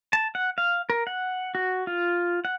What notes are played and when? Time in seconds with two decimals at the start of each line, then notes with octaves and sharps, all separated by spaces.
0.13 A5
0.35 F#5
0.58 F5
0.90 A#4
1.07 F#5
1.55 F#4
1.87 F4
2.45 F#5